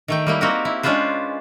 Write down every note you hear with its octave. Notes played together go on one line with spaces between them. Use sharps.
D#3 A3 G5
G3 A#3 E4
A#3 C4 D#4 F#4 G4 A#4
E4
G#3 C#4 D4 F4 B4 C5